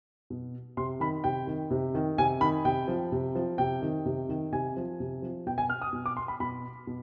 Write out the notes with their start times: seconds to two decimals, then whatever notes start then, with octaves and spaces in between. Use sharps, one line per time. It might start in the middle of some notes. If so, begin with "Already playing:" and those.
0.30 B2
0.77 C3 C6
1.00 D#3 B5
1.24 C3 G5
1.47 D#3
1.70 C3
1.95 D#3
2.18 C3 G#5
2.41 D#3 B5
2.65 C3 G5
2.88 F3
3.12 C3
3.35 F3
3.58 C3 G5
3.82 D#3
4.05 C3
4.29 D#3
4.52 C3 G#5
4.77 F3
5.00 C3
5.22 F3
5.47 B2 G5
5.58 G#5
5.70 F6
5.82 D#6
5.93 B2
6.06 D6
6.17 C6
6.28 B5
6.40 B2 B5
6.87 B2